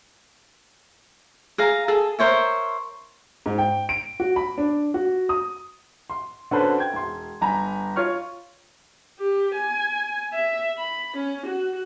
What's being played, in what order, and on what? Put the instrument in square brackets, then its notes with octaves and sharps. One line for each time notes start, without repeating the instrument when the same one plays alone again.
[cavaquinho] G#4 F5 A#5
G#4 A4
A#4 C5 C#5 E5
[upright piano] G#2
G5
D7
F#4
B5
D4
F#4
D#6
C6
D3 C#4 F#4 A4 B4 C5
G5 G#6
E1 C6
G1 G#5 A#5 B5
F4 C#5 C#6 F6
[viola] G4
G#5
E5
B5
C#4
F#4